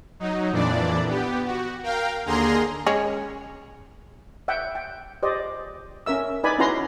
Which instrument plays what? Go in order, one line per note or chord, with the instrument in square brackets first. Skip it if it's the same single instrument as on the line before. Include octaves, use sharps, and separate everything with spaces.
[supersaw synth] F#3 D#4
F2 A#2 E3 D4 D5
B3 G4
F#4
A#4 F5 G5
D#2 D3 A#3 G#4 A#5 C6
[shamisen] G#3 C#4
[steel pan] E5 F#5 G5
G5
G4 C5 D5 D#5
C#4 A#4 E5 E6
D#4 B4 D5 G#5 B5
C#4 E4 F#4 B4 A#5 C6